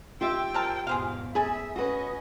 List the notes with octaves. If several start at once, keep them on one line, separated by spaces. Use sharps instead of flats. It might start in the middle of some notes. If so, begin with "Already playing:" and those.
F4 G4 E5 G5 E6
C4 A#4 A5
E2 G#2 B2 G#4 C5 F5
G#4 A4 E5 G#5 B5
C#4 F#4 B4 D#5